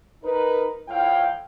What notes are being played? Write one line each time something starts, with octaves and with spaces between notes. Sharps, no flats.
D#4 A#4 B4
A2 F3 E4 F5 G5